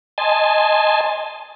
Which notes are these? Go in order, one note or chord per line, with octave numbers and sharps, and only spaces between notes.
D#5 G#5 A5 C6